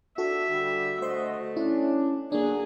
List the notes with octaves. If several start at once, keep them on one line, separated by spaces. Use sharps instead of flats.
D4 F#4 A4 E5
D3 G3
D3 A3 F#4 C5 D#5 C6
C#4 D4 E4
D3 F#3 A#3 D4 G#4